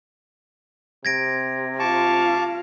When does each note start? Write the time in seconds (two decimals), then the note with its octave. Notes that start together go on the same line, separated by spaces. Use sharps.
1.05 C3 G#6 A#6 D7
1.79 F4 F5 A5 C#6 D6